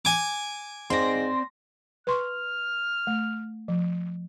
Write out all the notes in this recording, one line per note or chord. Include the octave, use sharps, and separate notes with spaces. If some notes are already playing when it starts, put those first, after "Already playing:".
G#5 D6
G#2 C4 D5 C6 A#6
B4 C6 C#6 F6
A3
F3